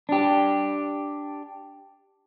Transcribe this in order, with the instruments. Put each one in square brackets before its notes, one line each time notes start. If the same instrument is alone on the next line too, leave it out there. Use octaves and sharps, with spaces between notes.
[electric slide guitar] D4 G4